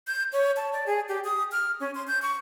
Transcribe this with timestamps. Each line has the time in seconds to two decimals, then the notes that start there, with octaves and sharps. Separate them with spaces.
0.07 G6
0.33 C#5
0.57 A5
0.73 D5
0.86 G#4
1.08 G4
1.24 D#6
1.52 F6
1.80 C#4
1.95 C6
2.07 G6
2.22 C#6